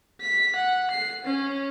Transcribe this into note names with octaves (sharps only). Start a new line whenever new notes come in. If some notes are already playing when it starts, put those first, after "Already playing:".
B6
F#5
C7
C#4